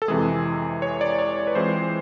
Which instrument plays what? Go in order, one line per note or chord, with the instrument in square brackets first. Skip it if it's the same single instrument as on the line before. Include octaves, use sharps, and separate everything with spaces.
[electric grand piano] A4
F2 C3 E3 G#3 G#4
C#5
D5
C#5
B4
E3 G#3 C4 F4 C5